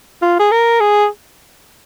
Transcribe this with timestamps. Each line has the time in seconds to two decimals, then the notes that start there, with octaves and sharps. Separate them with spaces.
0.22 F4
0.39 G#4
0.51 A#4
0.80 G#4